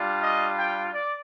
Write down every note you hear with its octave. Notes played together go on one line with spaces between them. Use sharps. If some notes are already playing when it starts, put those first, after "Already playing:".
Already playing: G3 D4 F4
D#5
G5
D5